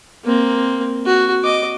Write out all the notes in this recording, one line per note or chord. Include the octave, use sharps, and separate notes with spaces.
A#3 C4
F#4
D#5 D6